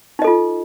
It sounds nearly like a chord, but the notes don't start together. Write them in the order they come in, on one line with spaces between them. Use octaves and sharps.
D#4 D#5 A4 F4